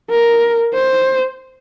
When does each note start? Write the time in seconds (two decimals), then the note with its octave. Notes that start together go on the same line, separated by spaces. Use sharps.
0.11 A#4
0.74 C5